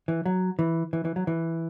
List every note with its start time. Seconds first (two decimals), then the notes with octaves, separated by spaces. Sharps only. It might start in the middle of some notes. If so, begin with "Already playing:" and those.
0.08 E3
0.26 F#3
0.59 E3
0.93 E3
1.05 E3
1.16 F#3
1.27 E3